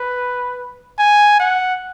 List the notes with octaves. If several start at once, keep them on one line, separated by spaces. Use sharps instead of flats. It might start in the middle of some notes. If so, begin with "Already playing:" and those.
Already playing: B4
G#5
F#5